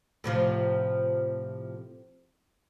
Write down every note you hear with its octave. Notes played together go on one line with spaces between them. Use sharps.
A2 C3 F3